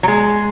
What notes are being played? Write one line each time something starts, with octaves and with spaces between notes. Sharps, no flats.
F#3
G#3